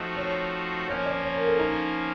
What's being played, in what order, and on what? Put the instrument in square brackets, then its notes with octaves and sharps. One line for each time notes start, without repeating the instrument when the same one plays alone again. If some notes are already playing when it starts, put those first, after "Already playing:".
Already playing: [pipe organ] F3 A3 C4 D#4 F#4
[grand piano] C#5
[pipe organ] F3 A#3 C#4 [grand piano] C#5
[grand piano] D5
C#5
A#4
A4
D#4